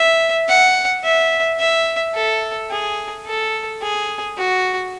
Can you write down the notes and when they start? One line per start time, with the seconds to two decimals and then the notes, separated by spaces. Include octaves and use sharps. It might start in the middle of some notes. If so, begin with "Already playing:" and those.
Already playing: E5
0.48 F#5
1.04 E5
1.59 E5
2.15 A4
2.71 G#4
3.26 A4
3.82 G#4
4.37 F#4